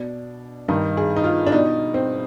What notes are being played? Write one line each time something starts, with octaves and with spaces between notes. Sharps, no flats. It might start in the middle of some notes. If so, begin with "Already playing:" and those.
Already playing: B2 D4
G2 D#3 D#4
G#4
D#4
F4
D4
B2 D#4
C4